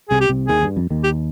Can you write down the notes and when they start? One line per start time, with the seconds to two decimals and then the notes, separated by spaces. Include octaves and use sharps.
0.10 C2 C3 G#4
0.21 G4
0.29 C2 C3
0.48 D#2 D#3 G#4
0.63 G2
0.77 F2
0.90 D#2 D#3
1.04 G4